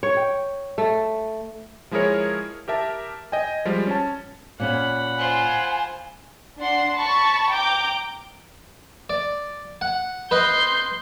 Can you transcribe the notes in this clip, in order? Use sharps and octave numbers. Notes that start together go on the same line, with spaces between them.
C#5
G5
A3
F3 G#3 E4 G#4 A#4 C#5
G4 A#4 E5 A5
D#5 G5 G#5
F3 G3 G#3
C#4 A5
A#2 C#4 F5 F#5 B5
F4 C5 G#5
D4 F#5 C6
A5 B5 C#6
G5 A#5 D6 G6
D5
F#5
B4 D#5 C6 G6